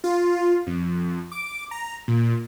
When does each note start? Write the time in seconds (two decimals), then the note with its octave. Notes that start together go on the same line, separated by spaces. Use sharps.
0.04 F4
0.67 F2
1.32 D6
1.71 A#5
2.08 A#2